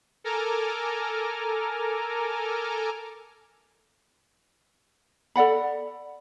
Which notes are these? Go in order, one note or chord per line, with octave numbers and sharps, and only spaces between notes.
A4 A#4 G#5 A#5 D6 F6
A4 D5 F#5 B5